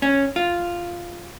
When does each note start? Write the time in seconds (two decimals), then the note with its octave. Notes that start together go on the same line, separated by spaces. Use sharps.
0.02 C#4
0.36 F4